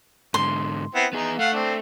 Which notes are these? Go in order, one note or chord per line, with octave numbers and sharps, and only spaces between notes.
G#2 D3 C6
B3 C4 E4
B3 D#4 G#4
A3 F5 F#5
C4 D4